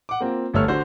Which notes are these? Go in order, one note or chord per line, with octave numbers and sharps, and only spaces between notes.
F#5 D6
A#3 C4 F4
G1 D2 A3 C#5 E6 F6
D3 F#4 C5